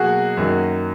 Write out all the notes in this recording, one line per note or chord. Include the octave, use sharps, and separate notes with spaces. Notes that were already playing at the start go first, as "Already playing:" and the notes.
Already playing: B2 F#3 A#3 F#4 G#4
F#2 D#3 F#3 A#3